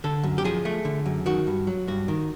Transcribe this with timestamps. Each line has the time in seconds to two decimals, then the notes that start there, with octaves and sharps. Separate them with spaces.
0.04 D3 A4
0.23 F#2
0.38 G4
0.44 F3 G#4
0.65 A3
0.85 D3
1.06 F#2
1.26 D#3 F#4
1.47 G2
1.67 F#3
1.87 G2 F#4
2.08 D#3